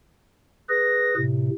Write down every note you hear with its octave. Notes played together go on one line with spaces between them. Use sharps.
G#4 B4 A#6
A2 C3